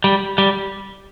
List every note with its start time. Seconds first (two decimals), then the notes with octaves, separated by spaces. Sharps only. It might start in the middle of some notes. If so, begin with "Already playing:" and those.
0.04 G3
0.38 G3